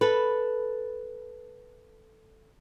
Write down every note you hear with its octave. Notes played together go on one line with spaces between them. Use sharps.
A4 B4